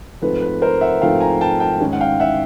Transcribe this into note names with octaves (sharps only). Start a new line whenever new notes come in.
G#2 F3 A3 C4 B4
B4
A#4 C5
E5 F#5
G#2 F3 A3 C4 F5 G5
G#5 A#5
G5 A5
G5 A5
G#2 D#3 G#3 C#4
F#5
F5 G5
E5 F#5